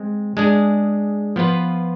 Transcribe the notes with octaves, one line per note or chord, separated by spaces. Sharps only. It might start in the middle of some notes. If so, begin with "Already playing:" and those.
Already playing: G#3 C4
G#3 D4 G#4
F3 B3 F4 B4